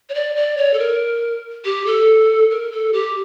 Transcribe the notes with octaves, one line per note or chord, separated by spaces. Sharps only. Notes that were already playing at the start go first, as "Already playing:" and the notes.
C#5
D5
D5
C#5
A4
A#4
G4
A4
A#4
A4
G4